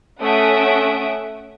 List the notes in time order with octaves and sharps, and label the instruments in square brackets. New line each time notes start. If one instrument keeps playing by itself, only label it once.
[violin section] A3 C#4 E5 F#5 D#6 D7